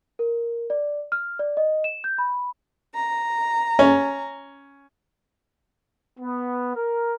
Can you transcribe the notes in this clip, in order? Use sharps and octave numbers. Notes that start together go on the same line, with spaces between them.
A#4
D5
F6
D5
D#5
E7
G6
B5
A#5
C#4
B3
A#4